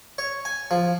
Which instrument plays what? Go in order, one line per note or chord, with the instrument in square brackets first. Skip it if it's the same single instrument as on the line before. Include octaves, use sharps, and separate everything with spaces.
[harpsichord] C#5
G#5
F3